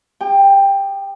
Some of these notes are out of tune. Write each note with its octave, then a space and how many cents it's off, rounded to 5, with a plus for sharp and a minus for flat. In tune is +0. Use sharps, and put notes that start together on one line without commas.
G4 +45 G5 +10